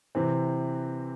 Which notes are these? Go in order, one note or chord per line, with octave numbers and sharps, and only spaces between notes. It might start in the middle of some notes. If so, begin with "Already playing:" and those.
C3 E3 C4